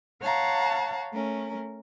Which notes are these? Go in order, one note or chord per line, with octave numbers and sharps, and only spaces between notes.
C#5 F5 F#5 A5 A#5
A3 C#4 A#4